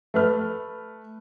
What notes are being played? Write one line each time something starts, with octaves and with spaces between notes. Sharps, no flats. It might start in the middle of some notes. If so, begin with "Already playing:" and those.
A3 B4 F6